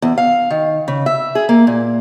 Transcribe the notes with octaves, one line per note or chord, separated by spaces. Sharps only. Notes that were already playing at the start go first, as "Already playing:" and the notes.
E2
F5
D#3
C#3
E5
G#4
A#3
A#2